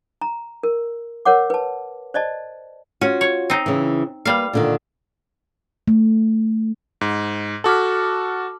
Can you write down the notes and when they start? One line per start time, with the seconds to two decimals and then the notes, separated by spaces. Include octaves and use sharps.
0.21 A#5
0.63 A#4
1.25 A#4 C#5 F#5 D6
1.50 B4 A5
2.14 C5 D5 D#5 A5
3.01 C#4 F4 F#4
3.21 C#5
3.50 C4 D#4
3.66 C#3 E3
4.25 G3 A#3 B4 F5
4.53 A#2 D3 D#3
5.88 A3
7.01 G#2
7.64 F#4 A4 A5 D6 F6